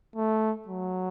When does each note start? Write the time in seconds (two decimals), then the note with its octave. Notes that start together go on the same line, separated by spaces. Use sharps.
0.16 A3
0.68 F#3